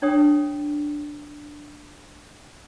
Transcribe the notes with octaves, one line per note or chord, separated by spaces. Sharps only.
D4 C#5 G5 D#6